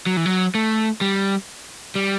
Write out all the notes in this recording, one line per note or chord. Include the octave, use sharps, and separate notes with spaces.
F#3
E3
F#3
A3
G3
G3